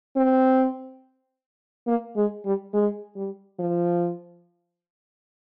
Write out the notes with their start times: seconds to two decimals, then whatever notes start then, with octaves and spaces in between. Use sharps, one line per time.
0.17 C4
1.87 A#3
2.16 G#3
2.45 G3
2.74 G#3
3.16 G3
3.59 F3